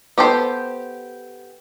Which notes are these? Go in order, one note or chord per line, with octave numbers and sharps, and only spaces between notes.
B3 G4 A4 C5